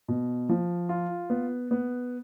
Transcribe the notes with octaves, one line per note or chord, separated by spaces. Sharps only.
B2
F3
F4
B3
B3